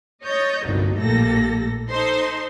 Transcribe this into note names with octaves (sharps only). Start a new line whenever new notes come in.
C#5 D#5 G6 A6 A#6
G1 C2 G2 A#2 F#3 D#4
A#1 A2 A#3 G4 A4 A#6
D#4 A4 C5 C6